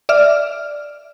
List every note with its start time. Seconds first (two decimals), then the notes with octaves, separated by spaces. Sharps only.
0.09 D5 E5 F6